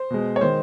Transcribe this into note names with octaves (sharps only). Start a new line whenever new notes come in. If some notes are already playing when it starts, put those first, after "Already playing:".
Already playing: C5
B2 G#3
C#5
D#3 G#3 C5